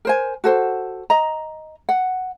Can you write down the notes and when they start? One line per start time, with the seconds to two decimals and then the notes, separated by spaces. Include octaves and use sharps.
0.05 A#4 C5 G#5
0.44 F#4 A4 C5
1.10 D#5 A#5
1.89 F#5